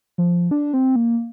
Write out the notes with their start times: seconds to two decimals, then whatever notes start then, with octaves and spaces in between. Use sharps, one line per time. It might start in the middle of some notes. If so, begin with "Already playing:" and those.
0.18 F3
0.51 D4
0.74 C4
0.96 A#3